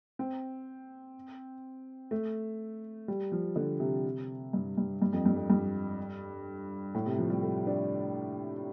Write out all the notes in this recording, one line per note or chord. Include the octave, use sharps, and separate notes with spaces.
C4
A3
G3
F3
D3
C3
G2
G2
G2
F2
G2
F2
G2
A2
C3
F3
G3
A3
D4